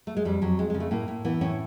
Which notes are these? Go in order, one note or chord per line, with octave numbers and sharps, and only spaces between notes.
A3
G#3
F2 G3
F2 F#3
F2 G#3
C#3 G#3
A3
A2 A#3
A2
E3 B3
A2 C#4